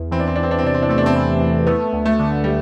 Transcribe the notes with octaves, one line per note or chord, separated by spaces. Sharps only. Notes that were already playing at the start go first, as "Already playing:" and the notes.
Already playing: E2
E3 C4
D4
C4
E2 D4
C4
D4
C4
C3 D4
C4
D4
A3 C4
D4
C4
E3
E2
A3 B3
D2
A3
D3
G3